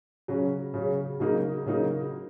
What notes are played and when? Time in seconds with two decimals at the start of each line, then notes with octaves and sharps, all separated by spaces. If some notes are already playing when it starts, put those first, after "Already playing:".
0.28 C#3 F#3 C#4
0.74 C#3 F#3 C#4
1.20 C#3 F#3 A#3 D#4
1.66 C#3 F#3 A#3 D#4